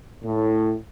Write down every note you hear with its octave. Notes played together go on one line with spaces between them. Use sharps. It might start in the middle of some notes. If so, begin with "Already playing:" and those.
A2